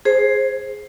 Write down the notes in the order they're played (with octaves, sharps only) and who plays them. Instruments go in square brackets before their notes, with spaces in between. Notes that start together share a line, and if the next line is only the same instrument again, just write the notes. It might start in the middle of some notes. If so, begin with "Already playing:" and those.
[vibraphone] G#4 C5